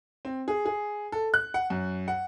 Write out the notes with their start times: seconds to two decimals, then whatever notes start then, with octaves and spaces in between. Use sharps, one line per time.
0.25 C4
0.48 G#4
0.66 G#4
1.12 A4
1.34 F#6
1.54 F#5
1.70 F#2
2.08 F#5